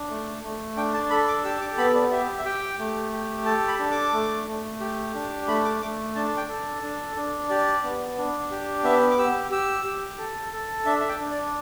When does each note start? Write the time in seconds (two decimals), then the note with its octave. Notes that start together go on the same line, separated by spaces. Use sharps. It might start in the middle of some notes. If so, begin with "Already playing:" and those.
Already playing: D4
0.10 A3
0.44 A3
0.77 D4 G5
0.94 A5
1.10 A4 B5
1.28 D6
1.44 G4 E6
1.61 D6
1.77 B3 B5
1.95 D5
2.12 G4 E5
2.39 E5
2.45 G4 G5
2.79 A3
3.12 G4
3.46 A4 A5
3.68 B5
3.79 D4
3.91 D6
4.13 A3
4.47 A3
4.81 G4
5.15 D4
5.47 A3 B5
5.65 D6
5.82 A3 D6
6.15 D4 A5
6.37 G5
6.48 A4
6.83 D4
7.16 D4
7.49 G4 D5
7.84 B3
8.18 D4
8.51 G4
8.84 B3 E5
9.11 D6
9.18 G4 E6
9.51 G4 E6
9.85 G4
10.18 A4
10.53 A4
10.86 D4 E5
11.01 E5
11.09 G5
11.20 D4
11.31 D5